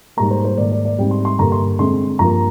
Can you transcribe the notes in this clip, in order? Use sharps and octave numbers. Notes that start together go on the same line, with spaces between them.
G#2 G3 A#3 A#5
C5
C5
G#2 D#3 A#3 D5
D5
D5
G#2 G3 C4 G5
C6
C6
G2 D3 G3 A#3 A#5
C6
D3 G#3 C4 C6
G2 F3 A#3 A#5